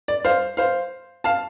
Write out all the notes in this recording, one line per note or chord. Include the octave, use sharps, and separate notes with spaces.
D5
C5 F5
C5 F5
F5 A5